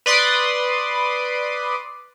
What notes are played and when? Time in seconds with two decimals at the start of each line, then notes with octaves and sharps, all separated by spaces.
0.06 B4 D5 C6 D#6